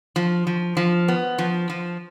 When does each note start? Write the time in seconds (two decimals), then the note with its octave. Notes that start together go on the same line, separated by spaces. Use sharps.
0.16 F3
0.47 F3
0.77 F3
1.08 B3
1.38 F3
1.70 F3